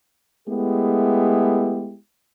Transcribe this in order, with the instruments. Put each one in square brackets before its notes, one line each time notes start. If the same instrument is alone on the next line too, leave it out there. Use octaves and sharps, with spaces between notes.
[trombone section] G#3 A3 B3 E4 G4 G#4